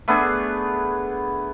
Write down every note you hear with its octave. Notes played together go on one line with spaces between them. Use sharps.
A3 B3 D4 G#4